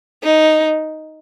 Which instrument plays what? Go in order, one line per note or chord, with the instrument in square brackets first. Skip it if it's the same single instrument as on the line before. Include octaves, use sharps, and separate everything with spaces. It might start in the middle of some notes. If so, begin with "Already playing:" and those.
[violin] D#4